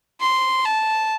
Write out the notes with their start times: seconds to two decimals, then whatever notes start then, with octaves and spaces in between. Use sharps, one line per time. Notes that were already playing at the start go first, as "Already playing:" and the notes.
0.20 C6
0.65 A5